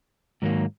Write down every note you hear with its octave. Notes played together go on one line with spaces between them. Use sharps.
G#2 D#3 F#3 A#3